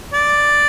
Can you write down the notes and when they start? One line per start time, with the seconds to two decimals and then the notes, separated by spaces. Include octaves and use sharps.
0.13 D5